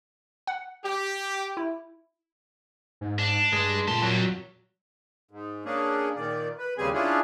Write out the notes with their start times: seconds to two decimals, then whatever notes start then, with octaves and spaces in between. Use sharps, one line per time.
0.47 F#5
0.85 G4
1.57 E4
3.01 G#2
3.19 D4
3.53 G2 G#3
3.88 A#2 C#3 A4 C6
4.02 F2 F#3 G3
5.31 G#2
5.65 A#3 C#4 D4 G#4
6.15 A#2 D#3 D5
6.58 B4
6.78 D#2 C#3 G3 C4 G#4 G#5
6.94 C#4 D4 E4 F4 G#4